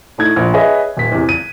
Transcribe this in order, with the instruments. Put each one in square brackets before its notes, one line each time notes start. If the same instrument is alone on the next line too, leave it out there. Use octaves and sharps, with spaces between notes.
[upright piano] A2 A3 D#4 G#6
A#1
G#4 B4 C#5 D#5 E5
D#1 B6
E2 C3
D#7